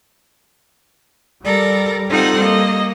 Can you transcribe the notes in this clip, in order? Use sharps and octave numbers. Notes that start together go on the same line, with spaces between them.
G3 A4 A#4 D5
C4 D#4 F4 A4 F#5
A#3 D#5